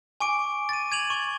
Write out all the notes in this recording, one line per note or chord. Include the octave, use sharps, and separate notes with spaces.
G#5 C#6 D6 D7
A6 D#7
G#6 D#7 F7 F#7
C#6